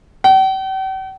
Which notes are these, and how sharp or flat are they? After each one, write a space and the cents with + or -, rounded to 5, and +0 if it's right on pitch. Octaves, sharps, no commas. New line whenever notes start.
G5 -45